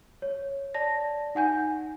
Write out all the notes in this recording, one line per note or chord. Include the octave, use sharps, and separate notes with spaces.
C#5
D5 A5 A#6
D#4 F#5 G#5 G6